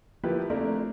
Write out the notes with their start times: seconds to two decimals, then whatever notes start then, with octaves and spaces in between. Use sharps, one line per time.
0.24 F3 A#3 E4 G4 B4
0.50 A3 A#3 C4 D4 A#4